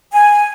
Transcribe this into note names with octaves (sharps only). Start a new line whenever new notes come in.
G#5